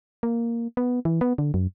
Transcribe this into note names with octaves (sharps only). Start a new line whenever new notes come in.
A#3
B3
E3
B3
D3
F#2